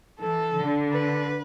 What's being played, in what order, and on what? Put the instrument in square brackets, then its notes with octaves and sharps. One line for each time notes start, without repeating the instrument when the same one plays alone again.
[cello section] E3 [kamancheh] A4
[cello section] D3
[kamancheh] B4